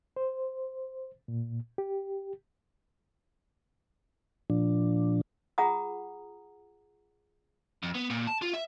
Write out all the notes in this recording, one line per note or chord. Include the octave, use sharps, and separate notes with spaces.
C5
A#2
G4
A#2 F3 D4
F4 G#4 F#5 A#5 D#6
F2
B3
A#2
A5
F4
E5